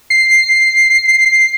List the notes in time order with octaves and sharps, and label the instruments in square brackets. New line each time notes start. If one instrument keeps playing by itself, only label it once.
[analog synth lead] C7